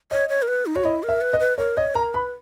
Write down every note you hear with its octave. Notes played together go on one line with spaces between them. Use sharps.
C#5 D#5
C#5
A#4
B4
D#4
F#4 C#5
E4 D#5
A#4
E5
B4
D#5
B4
A#4 C#5
C#5 D#5
A#4 A#5
B4 B5